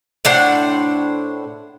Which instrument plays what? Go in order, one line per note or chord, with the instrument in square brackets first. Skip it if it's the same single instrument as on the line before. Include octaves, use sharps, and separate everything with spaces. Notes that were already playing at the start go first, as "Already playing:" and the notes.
[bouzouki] A2 D4 C5 F#5